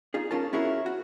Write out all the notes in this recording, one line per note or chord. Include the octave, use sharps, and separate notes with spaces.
D#4 F4 G#4
C#4 F4 A#4 A5
C#4 E4 F#4 G#4 A#4
F#4